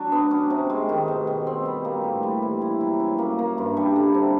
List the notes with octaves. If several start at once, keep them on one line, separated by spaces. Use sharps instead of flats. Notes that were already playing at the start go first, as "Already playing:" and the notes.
Already playing: F#3 D4 F#4
B3
C#4
C3
G#3
D#3
B2
B2
C4
G3
A#3
A2
G3
E3
E4
F#3
C#4
A#3
A#3
G2
G3
D3
C3